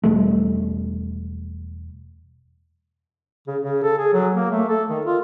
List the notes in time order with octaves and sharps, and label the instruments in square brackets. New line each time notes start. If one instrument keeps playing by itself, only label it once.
[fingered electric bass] E1 F#2 G3 A3
[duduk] C#3
C#3
A4
G#4
F#3
A#3
A3
A4
D#3
F4